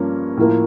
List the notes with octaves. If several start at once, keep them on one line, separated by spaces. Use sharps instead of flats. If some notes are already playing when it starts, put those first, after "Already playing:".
Already playing: G2 F3 A#3 C#4
A2 F3 A#3